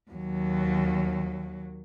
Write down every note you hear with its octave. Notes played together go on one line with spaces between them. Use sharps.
D#2 F#3